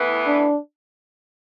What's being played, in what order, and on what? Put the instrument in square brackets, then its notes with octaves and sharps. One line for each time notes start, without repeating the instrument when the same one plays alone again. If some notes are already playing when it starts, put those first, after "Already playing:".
Already playing: [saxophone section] A2 E3 B3
[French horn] D4